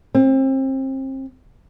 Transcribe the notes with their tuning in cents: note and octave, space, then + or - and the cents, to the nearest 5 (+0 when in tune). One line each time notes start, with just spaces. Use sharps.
C4 +30